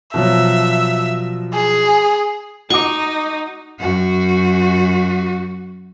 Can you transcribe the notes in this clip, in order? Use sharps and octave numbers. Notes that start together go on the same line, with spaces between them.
B2 F3 F#3 E5
G#4
D#4 F#4 C#6 D6
F#2 F#4